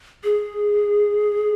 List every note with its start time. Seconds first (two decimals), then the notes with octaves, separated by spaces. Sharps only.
0.24 G#4